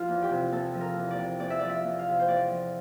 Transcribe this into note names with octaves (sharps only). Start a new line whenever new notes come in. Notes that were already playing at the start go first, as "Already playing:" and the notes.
Already playing: F3 F4
E2
G4
C3
E2 A4
F3
A#4
E2
D5
C3
E2 D5
E5
F3 D5
E5
E2
F5
C3
C5
E2 D5
F3